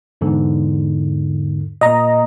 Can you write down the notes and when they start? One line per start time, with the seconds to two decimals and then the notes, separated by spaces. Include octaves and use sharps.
0.21 E2 G#2 D3
1.81 A#2 A#3 D#5 A#5